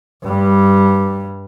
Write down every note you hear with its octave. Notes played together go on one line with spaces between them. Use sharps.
G2 G3